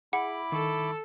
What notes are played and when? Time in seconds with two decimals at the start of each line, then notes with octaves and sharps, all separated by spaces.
0.13 E4 G#4 F#5 B5 D6
0.52 D#3 A4 C#6